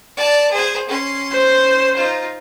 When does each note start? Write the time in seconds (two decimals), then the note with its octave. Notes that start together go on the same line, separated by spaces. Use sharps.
0.17 D5 A5
0.51 G#4 C5
0.88 C#4 C6
1.33 C5
1.96 D#4 F4